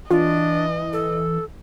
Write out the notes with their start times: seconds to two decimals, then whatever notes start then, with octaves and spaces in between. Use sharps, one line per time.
0.11 E3 D4 F4 D#5
0.93 A4